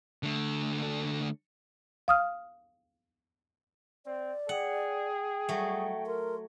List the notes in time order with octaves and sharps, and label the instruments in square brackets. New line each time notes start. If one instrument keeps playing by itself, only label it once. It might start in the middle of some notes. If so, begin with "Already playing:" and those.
[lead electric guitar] D3 A3
[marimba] F5 D#6 F6
[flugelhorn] C4 [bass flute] D5
[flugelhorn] G#4 [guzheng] F#5 [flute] G5
[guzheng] F#3 A3 [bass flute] G3
[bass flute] A#4 [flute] C6